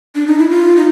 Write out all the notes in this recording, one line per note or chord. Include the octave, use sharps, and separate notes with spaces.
D4
D#4
E4
F4
D#4